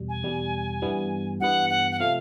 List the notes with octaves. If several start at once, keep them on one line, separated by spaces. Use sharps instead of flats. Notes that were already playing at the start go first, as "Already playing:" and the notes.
Already playing: E2 B2 G3
G#5
E2 B2 G3
G2 E3 G3 B3
G2 E3 G3 B3 F#5
F#5
F#5
C3 F3 A3 F5